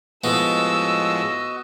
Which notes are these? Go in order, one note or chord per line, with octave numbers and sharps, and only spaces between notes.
A2 F3 G#3 B3 F#4 D#5 E6